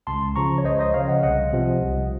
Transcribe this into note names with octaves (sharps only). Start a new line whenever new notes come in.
C#2 A5 C6
C#3 F3 A#5 C#6
C#5
C#2 C5 D#5
C5 D#5
C#3 F3 C#5 F5
D#5 F#5
C2 D#5 F#5
C3 F3
C2